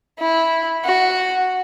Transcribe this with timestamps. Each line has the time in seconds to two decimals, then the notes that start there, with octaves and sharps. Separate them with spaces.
0.19 E4
0.85 F#4